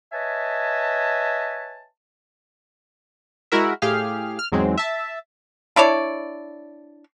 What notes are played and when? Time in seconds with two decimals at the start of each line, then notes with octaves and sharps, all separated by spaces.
0.13 B4 C#5 D#5 E5 G#5 A5
3.52 G#3 E4 F#4 A#4 E5
3.82 A2 G4 G#4 F5 F6
4.39 F6
4.52 E2 G#2 F#3 G#3 C4
4.78 E5 A5
5.76 D4 E4 C#5 D5